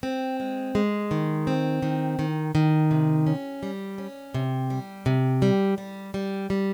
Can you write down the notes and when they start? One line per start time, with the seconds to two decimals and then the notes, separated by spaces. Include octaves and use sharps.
0.03 C4
0.40 G#3
0.75 G#3
1.11 D#3
1.47 C4
1.82 D#3
2.19 D#3
2.55 D#3
2.91 C3
3.27 C#4
3.63 G3
3.98 C#4
4.34 C3
4.70 G3
5.06 C3
5.42 G3
5.78 G3
6.14 G3
6.50 G3